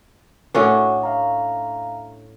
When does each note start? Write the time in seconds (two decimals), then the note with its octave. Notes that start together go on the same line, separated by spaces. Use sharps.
0.55 A2 C#4 D4 F#4 F#5
1.03 E5 F5 A#5